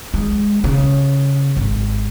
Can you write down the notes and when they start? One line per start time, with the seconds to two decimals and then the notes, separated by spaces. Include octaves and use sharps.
0.14 G#3
0.64 C#3
1.57 G#1